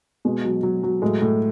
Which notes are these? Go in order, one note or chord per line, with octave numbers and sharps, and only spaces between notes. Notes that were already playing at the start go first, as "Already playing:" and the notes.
B2 G#3
F#3
F#3
F#3
A2 G#3
A2